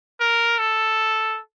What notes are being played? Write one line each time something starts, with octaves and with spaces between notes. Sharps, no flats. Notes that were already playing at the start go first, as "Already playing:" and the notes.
A#4
A4